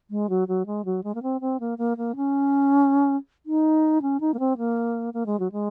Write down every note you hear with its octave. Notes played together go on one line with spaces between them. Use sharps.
G#3
F#3
F#3
G#3
F#3
G#3
A#3
C4
C4
A#3
A#3
A#3
C#4
D#4
C#4
D#4
A#3
C4
A#3
A#3
G#3
F#3
G#3